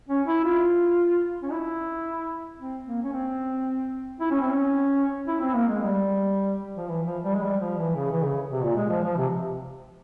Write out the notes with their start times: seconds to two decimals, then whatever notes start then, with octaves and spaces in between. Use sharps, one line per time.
0.09 C#4
0.27 E4
0.44 F4
1.43 C#4
1.52 E4
2.59 C4
2.86 A#3
3.02 C#4
3.13 C4
4.20 E4
4.31 C#4
4.41 C4
4.51 C#4
5.27 E4
5.41 C4
5.54 A#3
5.68 G#3
5.81 G3
6.76 F3
6.88 E3
7.06 F3
7.24 G3
7.35 G#3
7.43 G3
7.60 F3
7.78 E3
7.95 C#3
8.12 E3
8.23 C#3
8.52 C3
8.63 A#2
8.76 G#3
8.89 F3
9.03 F3
9.16 C3